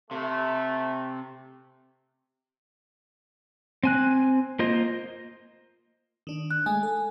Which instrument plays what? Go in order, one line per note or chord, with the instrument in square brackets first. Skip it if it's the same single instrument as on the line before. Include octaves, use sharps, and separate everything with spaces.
[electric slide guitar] C3 [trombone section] A3
[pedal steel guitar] C4 G#5 F#6
A#3 F4 C5 D#5
[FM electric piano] D#3 D4
[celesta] F#6
[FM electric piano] G#3 A3 D#5 [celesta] G#5
[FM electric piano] A4